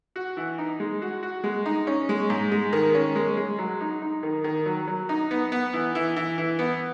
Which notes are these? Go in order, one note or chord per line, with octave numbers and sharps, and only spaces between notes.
F#4
E3
D#4
G#3
F#4
F#4
G#3
D#4
C#4
G#3
G#2
G#3
D#3
C#4
G#3
G#3
F#3
D#4
D#4
D#3
D#3
F#3
F#3
D#4
B3
B3
E3
E3
E3
E3
B3